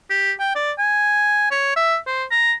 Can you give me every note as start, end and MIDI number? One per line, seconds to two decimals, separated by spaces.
0.10 0.32 67
0.40 0.53 79
0.55 0.72 74
0.79 1.50 80
1.51 1.75 73
1.76 1.97 76
2.07 2.24 72
2.31 2.53 82